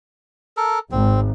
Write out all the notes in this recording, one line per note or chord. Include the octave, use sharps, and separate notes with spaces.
A4 A#4
G#1 C4